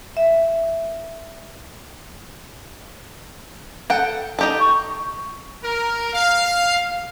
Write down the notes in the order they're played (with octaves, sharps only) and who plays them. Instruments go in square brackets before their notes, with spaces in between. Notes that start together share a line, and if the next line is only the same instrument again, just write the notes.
[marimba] E5
[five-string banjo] A4 F#5 G5
D#4 G4 A4
[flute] C#6
[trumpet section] A#4
F5